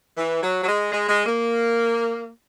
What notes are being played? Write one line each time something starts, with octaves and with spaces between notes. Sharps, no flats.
E3
F#3
F#3
G#3
G#3
G#3
A#3